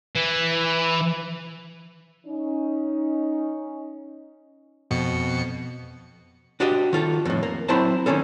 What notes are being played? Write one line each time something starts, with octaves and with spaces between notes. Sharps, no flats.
E3
C#4 D#4
F2 B2 C#7
D4 F#4 G4 D#5
D#3 F4 A4
F2 A2
A#3
F#3 C4 E4 C5 A5 A#5
D#3 G#3 A#3 C#4 A4